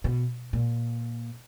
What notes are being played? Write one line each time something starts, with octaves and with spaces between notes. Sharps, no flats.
B2
A#2